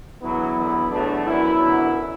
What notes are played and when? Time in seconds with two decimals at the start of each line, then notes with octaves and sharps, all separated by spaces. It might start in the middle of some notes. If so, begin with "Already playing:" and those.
0.21 E2 D3 F#3 B3 E4
0.57 E2 D3 F#3
0.91 E2 B2 F#3 A3 D4
1.26 F#2 F#3 B3 E4
1.60 F#2 D3 F#3